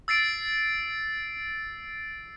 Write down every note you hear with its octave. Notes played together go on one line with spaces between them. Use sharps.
E6 A6 C7 D7